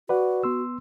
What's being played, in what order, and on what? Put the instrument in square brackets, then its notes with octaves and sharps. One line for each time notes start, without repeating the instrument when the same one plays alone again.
[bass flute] F#4 [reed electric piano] B4 D5 F#5
[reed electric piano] B3 C6 E6